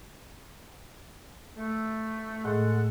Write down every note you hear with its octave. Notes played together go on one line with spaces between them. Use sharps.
A3
A2 G#3 A3 A4 F#5